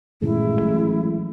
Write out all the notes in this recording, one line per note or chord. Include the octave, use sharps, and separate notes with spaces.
A1 G2 A#2 D#3 G#3 E4
E3 F#3 A3